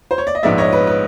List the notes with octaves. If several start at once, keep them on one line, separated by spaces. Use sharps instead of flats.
C5
C#5
D5
D#5
A#1 G#2 F3 G#3 B3 D5 E5
C#5 D#5
B4
B4